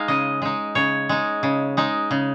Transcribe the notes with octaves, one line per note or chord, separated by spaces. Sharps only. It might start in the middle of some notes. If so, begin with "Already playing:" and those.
Already playing: G#3 D#4 F5
C#3 D#5
G#3 D#4
C#3 C#5
G#3 D#4
C#3
G#3 D#4
C#3